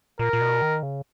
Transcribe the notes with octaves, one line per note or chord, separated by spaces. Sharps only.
A#2 A#4
A#2
B2
D#3
C#3